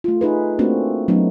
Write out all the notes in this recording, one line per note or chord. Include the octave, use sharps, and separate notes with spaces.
A3 F4
D#4 G#4 B4
A3 A#3 C4 D4 F#4
F#3 A3 B3 C#4 D#4